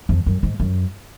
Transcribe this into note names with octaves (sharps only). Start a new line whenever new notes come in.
F2
F#2
G#2
F#2